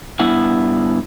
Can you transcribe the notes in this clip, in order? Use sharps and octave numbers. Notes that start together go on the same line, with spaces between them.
G2 B3 E4 F#5